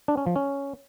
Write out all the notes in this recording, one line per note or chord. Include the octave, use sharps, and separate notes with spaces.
D4
C#4
F3
C#4